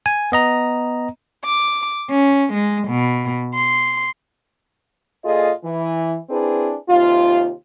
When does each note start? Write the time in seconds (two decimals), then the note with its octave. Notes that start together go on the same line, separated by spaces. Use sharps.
0.06 G#5
0.32 B3 D#5 A#5
1.44 D6
2.10 C#4
2.52 G#3
2.89 B2
3.54 C6
5.24 A#2 F4 G#4 A4 D#5
5.63 E3
6.30 C4 D4 E4 G#4 B4
6.89 D#2 C3 F4